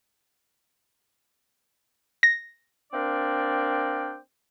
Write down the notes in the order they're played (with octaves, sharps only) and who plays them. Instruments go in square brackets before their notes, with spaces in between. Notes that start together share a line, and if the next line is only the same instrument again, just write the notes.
[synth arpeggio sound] A#6
[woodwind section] A#3 C4 D4 A#4 D5 G5